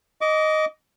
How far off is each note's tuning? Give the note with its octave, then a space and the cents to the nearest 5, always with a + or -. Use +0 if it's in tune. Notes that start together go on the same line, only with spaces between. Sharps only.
D#5 +0 D6 -30